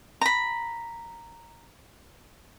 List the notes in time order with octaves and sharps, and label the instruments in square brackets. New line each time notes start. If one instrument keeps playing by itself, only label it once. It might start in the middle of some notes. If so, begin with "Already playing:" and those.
[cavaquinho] A#5 B5